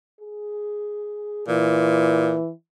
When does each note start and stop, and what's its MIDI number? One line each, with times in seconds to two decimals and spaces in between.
0.20 1.47 68
1.48 2.35 46
1.48 2.51 52